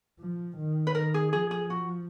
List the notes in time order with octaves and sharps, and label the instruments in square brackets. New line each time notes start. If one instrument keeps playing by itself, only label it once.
[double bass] F3
D#3
[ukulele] B4
[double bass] D#3 [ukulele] A#4
[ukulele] G#4
[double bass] F3 [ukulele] G#4
[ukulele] G#4
F#4